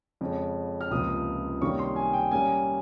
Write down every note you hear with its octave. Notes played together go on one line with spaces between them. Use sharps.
F2 C#3 G#3 C#4
F6
C#2 C3 F3 A#3 D#6
C3 D#3 G3 A#3 C#4 C#6
C6
G#5
G5
A#2 G3 A#3 C#4 G#5